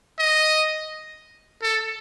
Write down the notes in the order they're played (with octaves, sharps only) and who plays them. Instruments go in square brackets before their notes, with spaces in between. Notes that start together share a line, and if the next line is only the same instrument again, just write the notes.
[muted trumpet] D#5
A4